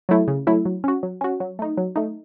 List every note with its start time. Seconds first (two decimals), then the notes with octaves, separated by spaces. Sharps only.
0.09 F#3 A3 E4
0.28 C#3
0.47 F#3 A3 E4
0.65 F#3
0.84 C#4 F#4
1.03 F#3
1.21 C#4 F#4
1.40 F#3
1.59 A3 D#4
1.77 F#3
1.96 A3 D#4